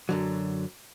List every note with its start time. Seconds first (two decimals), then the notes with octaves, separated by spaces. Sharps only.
0.09 F#2 D3 F#3